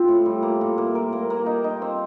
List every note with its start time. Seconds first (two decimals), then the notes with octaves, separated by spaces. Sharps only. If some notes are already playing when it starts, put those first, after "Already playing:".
Already playing: C4 F4
0.08 A2
0.26 G3
0.43 A#3
0.61 A2
0.78 A#3
0.95 A#4
1.13 A#3
1.30 A#3
1.46 D#4
1.64 D#4
1.82 C4